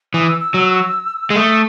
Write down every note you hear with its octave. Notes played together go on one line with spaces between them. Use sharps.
E3 D#6
E6
E6
F#3
G#3
A3 D#6